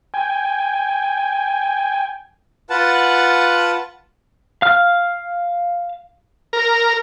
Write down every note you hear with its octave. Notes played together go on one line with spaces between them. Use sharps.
G5 G#5
F4 B4 F#5 A5
F5 F6
A#4